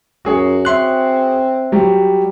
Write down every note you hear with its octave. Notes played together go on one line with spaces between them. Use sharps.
F#2 F#4 G#4 C#5
C4 E5 C6 F#6
F#3 G3